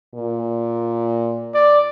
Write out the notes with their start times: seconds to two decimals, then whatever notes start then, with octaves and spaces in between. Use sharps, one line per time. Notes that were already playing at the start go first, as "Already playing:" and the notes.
0.14 A#2
1.54 D5